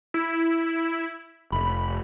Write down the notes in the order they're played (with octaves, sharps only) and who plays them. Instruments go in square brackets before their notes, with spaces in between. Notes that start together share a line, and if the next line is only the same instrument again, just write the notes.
[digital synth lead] E4
[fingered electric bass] F1 [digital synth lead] B5